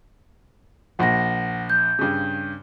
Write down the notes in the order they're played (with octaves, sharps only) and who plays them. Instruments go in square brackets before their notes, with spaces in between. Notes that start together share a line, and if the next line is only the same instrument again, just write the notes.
[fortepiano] A#1 F3 [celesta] F#5 A#6
[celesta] G6
[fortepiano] G2 C#3